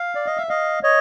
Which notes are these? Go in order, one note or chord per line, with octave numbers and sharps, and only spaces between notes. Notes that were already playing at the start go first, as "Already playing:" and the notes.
Already playing: F5
D5
D#5
E5
D#5 F5
C#5 D#5